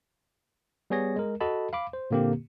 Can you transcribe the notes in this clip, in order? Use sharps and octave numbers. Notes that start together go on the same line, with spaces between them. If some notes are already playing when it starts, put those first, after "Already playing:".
G3 B3 G#4 C#5 A#6
G#3 A#4
F#4 A4 D#5 A5 B5
F5 B5 D6
C5
A#2 D3 A#3 C4 G4